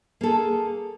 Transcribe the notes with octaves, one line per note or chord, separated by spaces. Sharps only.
A#3 G#4 A4